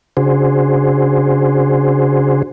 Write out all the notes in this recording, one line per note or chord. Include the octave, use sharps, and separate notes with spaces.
C#3 D4 F#4 G#4 C5